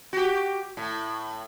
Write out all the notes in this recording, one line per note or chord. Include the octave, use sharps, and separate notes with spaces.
F#4 G4
A2